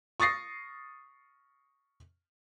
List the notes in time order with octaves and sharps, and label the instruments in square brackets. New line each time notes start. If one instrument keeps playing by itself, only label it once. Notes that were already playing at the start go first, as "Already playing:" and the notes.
[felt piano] C#6 D#6 A6 A#6 C7